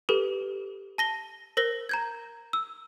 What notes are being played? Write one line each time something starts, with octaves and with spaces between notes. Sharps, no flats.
G4 A4 B4
A5 A#6 G7
A#4 C5 A#6 G7
A#5 G6 G#6
E6